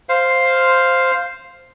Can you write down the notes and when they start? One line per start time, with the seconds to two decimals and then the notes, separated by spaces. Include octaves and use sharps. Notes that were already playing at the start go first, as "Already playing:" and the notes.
0.09 C5 F5